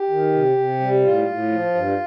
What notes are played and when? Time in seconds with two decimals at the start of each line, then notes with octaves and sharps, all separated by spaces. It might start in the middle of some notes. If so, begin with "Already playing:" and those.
Already playing: G4
0.09 D#3
0.33 C3
0.57 C3
0.80 G3
1.04 A2 F4
1.28 A2
1.51 F3
1.75 G2